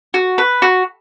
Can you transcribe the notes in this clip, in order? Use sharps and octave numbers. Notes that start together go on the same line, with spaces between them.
F#4
B4
F#4